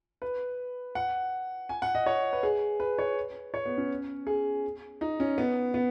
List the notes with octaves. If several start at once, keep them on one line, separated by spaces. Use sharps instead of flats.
B4
F#5
G#5
F#5
D#5
C#5
B4
G#4
B4
C#5
C#5
B3
C#4
G#4
D#4
C#4
B3
B3